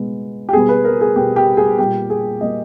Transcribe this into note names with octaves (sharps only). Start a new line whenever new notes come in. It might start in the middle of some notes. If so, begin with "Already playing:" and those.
Already playing: B2 G#3 B3
G4
B2 G3 B3 G#4
B4
A#4
G#4
B2 G3 B3 G4
G4
G#4
A#2 G3 A#3 G4
G#4
A#2 G3 A#3 D#5